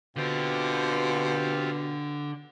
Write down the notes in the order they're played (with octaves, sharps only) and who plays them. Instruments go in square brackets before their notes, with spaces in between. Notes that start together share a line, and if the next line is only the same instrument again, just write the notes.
[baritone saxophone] B2 [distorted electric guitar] D3 [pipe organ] C4 F4 G4